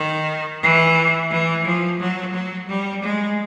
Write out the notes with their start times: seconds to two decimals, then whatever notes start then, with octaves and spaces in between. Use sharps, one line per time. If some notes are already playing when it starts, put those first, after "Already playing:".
Already playing: D#3
0.62 E3
1.31 E3
1.65 F3
2.00 F#3
2.33 F#3
2.68 G3
3.03 G#3